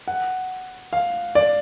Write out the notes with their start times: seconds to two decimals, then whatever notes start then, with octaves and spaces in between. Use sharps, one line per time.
0.08 F#5
0.93 F5
1.35 D5